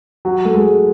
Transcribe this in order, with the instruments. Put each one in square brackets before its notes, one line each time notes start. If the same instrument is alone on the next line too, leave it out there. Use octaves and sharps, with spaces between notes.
[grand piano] F#3
A3
G#3